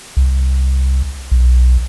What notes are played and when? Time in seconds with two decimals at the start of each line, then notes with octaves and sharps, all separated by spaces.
0.17 C2
1.32 B1